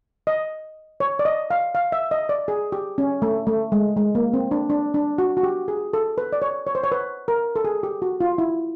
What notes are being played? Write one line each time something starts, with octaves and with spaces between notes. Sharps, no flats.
D#5
C#5
D5
D#5
F5
F5
E5
D#5
D5
G#4
G4
C#4
A3
A3
G#3
G#3
A#3
C4
D4
D4
D4
F#4
F#4
G4
G#4
A4
B4
D5
C#5
C#5
C5
C#5
B4
A#4
A4
G#4
G4
F#4
F4
E4